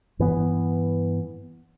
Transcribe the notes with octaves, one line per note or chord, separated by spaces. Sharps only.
G2 E3 B3